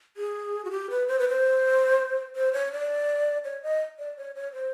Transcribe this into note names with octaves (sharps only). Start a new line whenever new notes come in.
G#4
F#4
G4
B4
C5
B4
C5
C5
C#5
D5
C#5
D#5
D5
C#5
C#5
C5